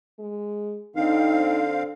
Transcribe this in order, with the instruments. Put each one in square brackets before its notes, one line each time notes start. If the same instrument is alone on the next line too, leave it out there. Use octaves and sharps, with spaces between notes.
[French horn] G#3
[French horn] D3 [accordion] C4 F5 [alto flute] D#4